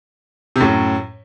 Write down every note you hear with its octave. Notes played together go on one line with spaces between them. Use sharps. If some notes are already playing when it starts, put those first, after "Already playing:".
C3
F#2 A2